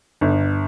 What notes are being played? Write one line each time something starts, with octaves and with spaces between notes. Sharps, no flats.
G1